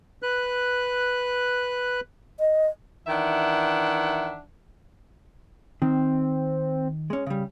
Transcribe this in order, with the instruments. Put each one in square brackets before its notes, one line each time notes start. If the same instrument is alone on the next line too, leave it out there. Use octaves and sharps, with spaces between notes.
[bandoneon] B4 F#6
[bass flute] D#5
[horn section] D#3 E3 D4 E5 F#5
[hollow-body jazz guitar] D#3 [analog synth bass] C4
[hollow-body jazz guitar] G#3 C#4
C#3 G3